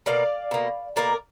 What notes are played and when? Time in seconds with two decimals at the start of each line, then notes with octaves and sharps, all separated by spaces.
0.06 B2 A#3 D5 F5
0.51 B2 A#3
0.96 B2 A#3 A#4 D5